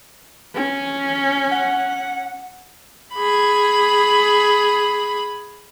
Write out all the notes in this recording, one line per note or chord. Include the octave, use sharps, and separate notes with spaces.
C#4
F#5
G#4 B5